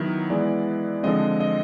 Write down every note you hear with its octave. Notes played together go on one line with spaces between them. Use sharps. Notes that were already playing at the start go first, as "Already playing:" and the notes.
Already playing: D#3 F#3 B3 E4
E3 G#3 B3 E4 D5
D3 F3 G#3 C4 D#5
D#5